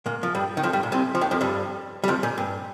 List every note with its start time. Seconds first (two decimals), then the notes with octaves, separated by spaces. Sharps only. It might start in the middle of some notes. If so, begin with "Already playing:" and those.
0.06 A#2 A#3
0.23 F3
0.35 G2 G3
0.57 D#3
0.63 F2 F3
0.73 G2 G3
0.83 A#2
0.92 C2 C3
1.15 F3
1.21 D#2 D#3
1.31 F2 F3
1.41 G2 G3
2.04 G3
2.08 F2 F3
2.23 A#2
2.38 G2